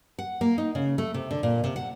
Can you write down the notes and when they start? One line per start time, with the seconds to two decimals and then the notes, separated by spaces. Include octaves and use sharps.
0.19 F#5
0.41 A#3
0.58 D#4
0.75 C#3
0.98 A3
1.14 C3
1.31 D3
1.43 A#2
1.64 C3
1.76 F#5